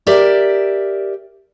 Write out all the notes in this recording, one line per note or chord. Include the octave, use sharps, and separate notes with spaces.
G4 A#4 D5 E5